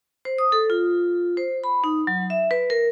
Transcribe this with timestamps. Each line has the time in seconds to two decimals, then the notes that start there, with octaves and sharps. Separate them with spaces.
0.25 C5
0.38 D#6
0.52 A4
0.70 F4
1.37 C5
1.64 B5
1.84 D#4
2.07 F#3
2.30 E5
2.51 B4
2.70 A#4